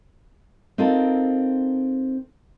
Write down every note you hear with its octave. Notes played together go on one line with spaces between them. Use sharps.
C4 D#4 F4 A4 A#4